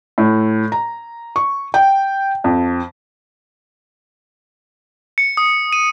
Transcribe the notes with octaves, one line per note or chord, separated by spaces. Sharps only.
A2
A#5
C#6
G5
F2
C#7
D#6
D#7